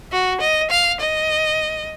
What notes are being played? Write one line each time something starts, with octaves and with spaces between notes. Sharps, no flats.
F#4
D#5
F5
D#5